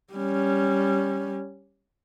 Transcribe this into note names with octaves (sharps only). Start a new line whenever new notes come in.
G3 C#4